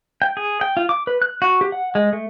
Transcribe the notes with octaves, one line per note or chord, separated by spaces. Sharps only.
G5
G#4
G5
F4
D6
B4
F#6
F#4
G4
F#5
G#3
A3